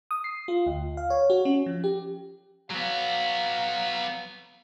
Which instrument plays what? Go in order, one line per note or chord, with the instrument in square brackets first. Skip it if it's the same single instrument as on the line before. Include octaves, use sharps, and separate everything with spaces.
[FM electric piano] D#6
C7
F4
D2
F5
C#5
F#4
C#4
F3
G4
[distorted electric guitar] F#3 B3 [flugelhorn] F5